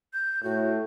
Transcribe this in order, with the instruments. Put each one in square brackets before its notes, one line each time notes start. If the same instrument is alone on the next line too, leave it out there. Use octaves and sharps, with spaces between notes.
[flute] G6
[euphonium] A2 [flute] F#4